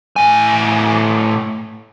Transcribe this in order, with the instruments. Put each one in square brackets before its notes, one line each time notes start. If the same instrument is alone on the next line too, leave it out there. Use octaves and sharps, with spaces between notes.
[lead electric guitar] A2 G#5